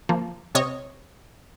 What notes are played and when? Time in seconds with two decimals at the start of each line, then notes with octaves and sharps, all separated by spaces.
0.09 F3 A#3
0.55 C3 C#5 D#5